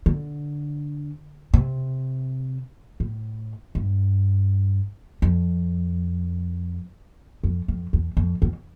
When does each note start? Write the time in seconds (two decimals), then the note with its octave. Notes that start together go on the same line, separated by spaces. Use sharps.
0.06 D3
1.54 C3
3.00 A2
3.75 G2
5.22 F2
7.44 F2
7.68 F2
7.93 E2
8.17 F2
8.42 E2